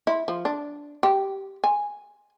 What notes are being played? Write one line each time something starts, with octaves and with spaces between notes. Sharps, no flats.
E4
F3
D4
G4
G#5